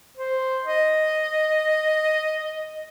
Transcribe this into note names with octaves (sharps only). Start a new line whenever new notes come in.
C5
D#5